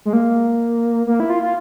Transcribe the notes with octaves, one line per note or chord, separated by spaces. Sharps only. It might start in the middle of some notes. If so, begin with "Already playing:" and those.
G#3
A#3
A#3
E4
F4
F4